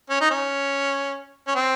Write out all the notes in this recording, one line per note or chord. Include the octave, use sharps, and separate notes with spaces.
C#4
D#4
C#4
C#4
C4